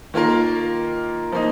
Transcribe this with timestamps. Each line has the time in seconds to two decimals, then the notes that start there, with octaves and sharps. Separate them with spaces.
0.14 D#3 A#3 F4 A#4
1.32 F3 A#3 D#4